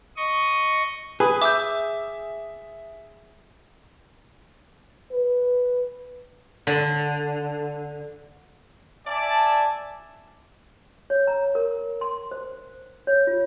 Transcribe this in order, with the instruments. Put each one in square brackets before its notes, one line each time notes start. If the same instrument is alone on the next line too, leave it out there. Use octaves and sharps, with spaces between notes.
[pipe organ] D#5 C#6
[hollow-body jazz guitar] G#4 [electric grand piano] B4 B5 D#6
[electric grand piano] E5 [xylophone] D6 E6 G6
[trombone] B4
[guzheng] D3
[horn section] D5 [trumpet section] E5 G#5 A5
[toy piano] C#5
A#5
A#4
C6
C5
C#5
F4